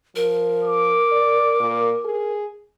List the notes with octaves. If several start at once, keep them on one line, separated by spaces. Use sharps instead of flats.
F3 A#4
D6
D5
A#2
G#4